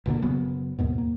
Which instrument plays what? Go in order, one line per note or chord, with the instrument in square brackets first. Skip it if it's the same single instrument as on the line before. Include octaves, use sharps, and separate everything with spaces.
[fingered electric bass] F1 B2 D3 A#3
F#1 C#3 F#3 B3
D#2 G#2 B2
A#3